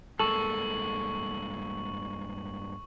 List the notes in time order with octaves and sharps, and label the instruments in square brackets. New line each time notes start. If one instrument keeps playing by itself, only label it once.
[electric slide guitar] G2 G#3 A#3 [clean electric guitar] A4 [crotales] C#6 F#7